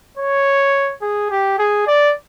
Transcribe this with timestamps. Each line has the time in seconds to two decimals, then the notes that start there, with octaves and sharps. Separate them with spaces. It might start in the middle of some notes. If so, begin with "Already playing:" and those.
0.17 C#5
1.02 G#4
1.30 G4
1.58 G#4
1.87 D5